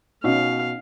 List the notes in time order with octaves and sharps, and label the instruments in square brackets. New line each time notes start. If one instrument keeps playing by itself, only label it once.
[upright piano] B2 [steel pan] C#4 D#4 [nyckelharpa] F5